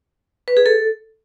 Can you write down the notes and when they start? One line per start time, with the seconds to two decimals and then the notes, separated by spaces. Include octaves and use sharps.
0.48 B4
0.57 G#4
0.66 A4